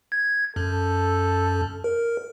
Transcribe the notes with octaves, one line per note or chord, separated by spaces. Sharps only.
G#6
F#2 A4
A#4